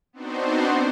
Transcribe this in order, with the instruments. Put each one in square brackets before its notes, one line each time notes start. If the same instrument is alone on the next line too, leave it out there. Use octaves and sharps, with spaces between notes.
[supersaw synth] B3 C4 D4 D#4 F#4 C5